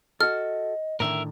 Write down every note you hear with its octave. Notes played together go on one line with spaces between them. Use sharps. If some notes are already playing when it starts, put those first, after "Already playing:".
F#4 A4 D#5 F6
A2 D3 D#3 A#4 E5